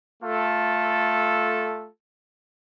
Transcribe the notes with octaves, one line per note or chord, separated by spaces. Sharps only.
A3 F4 A4